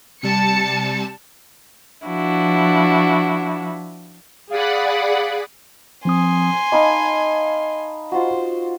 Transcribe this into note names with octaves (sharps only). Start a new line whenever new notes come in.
C3 G3 A5 C#7
F3 D4 E4 F#4
G#4 D5 F5 F#5 B5
F3 C4 G#5 C6 D#6
D#4 D#5 F5 A5 B5 D6
F4 F#4 C5